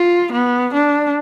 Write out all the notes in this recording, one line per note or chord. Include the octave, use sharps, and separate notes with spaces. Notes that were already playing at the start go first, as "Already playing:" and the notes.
Already playing: F4
B3
D4